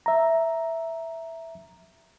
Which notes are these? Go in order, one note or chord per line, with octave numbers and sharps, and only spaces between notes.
E5 A#5